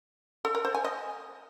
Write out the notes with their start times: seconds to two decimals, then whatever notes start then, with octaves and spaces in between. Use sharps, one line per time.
0.45 A4
0.55 A#4
0.65 C5
0.75 G#5
0.84 D#5